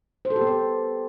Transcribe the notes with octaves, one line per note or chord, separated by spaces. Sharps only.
C5
A4
G4
B3
C5